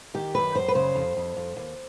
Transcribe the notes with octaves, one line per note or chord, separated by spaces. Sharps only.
D#3 G4
F#2 B4
F#2 C5
B4
C#3 C5
F2
F2
F2
D#2